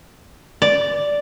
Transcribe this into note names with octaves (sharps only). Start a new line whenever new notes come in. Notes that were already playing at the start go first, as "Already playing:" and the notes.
D5